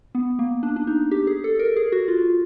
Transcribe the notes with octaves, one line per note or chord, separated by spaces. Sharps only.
B3
A#3
D4
D4
D#4
G4
G#4
A4
A#4
G#4
F#4
F4